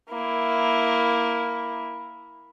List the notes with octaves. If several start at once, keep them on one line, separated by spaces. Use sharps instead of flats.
A#3 E4